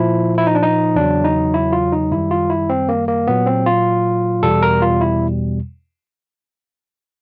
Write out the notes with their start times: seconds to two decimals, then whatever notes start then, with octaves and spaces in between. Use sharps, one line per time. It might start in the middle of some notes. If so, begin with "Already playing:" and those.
Already playing: A#2 F3 E4
0.38 E4
0.47 D#4
0.55 D4
0.63 D#4
0.96 E2 C#3 F#3 D4
1.24 D#4
1.54 E4
1.73 F4
1.92 D#4
2.11 F#2 D#3 G3 E4
2.31 F4
2.50 E4
2.70 C4
2.89 A#3
3.08 A#3
3.27 A#2 F#3 B3
3.46 C4
3.66 F4
4.43 E2 B2 G3 A4
4.63 A#4
4.82 F4
5.01 E4